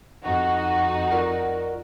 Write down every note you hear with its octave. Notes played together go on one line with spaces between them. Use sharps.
F2 D#4 F#4
F4 A#4 D5